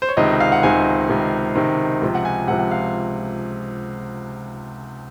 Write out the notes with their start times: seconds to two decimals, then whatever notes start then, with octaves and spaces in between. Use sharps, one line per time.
0.02 C5
0.09 C#5
0.17 C#2 C3 D#3 D#5
0.40 F5
0.52 F#5
0.63 C#2 C3 D#3 G#5
1.09 C#2 C3 D#3
1.55 C#2 C3 D#3
2.02 C#2 C3 F3
2.15 F#5
2.25 G#5
2.47 C#2 C3 F3 F#5
2.59 F#5
2.71 F5